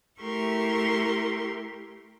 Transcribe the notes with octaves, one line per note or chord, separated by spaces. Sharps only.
A3 E4 G4 A#4 C6 C#6